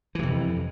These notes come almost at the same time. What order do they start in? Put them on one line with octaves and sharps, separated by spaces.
E3 C3 F2